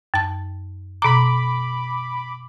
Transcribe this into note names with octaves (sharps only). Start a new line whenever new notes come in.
F#2 A5
B2 A#5 B5 D6